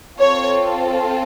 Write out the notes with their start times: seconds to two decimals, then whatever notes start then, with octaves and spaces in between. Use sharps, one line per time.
0.19 C4 F4 A4 C#5